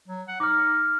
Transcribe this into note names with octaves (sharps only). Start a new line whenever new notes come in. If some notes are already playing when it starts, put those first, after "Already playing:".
F#3
F#5
D#4 D6 F6